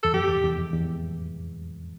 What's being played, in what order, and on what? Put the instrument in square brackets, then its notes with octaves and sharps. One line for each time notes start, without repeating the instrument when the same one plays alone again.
[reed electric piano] E2 [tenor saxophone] A4
[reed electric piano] F2 [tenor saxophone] G4
[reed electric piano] E2
E2
F2
E2